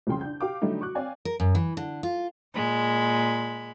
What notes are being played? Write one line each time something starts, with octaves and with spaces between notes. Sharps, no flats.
C2 F2 C#3 G5 C6
D4 G6
G4 F5 D6
D3 D#3 F#3 G3 A3 D#4
F#4 C#6 D6 F#6
C4 C#5 D5 F5 G5 G#5
A#4
F#2
E3
D3
F4
A#2 G#3 B5